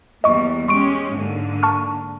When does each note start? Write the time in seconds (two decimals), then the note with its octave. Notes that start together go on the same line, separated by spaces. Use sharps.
0.24 E2 G3 A#3 D#5 C#6
0.68 G#3 C#4 G4 C6 C#6 D7
1.16 G#2 D3 A#3
1.63 A5 C#6 F6